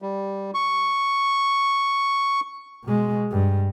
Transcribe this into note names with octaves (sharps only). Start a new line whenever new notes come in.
G3
C#6
B2 G#3
G2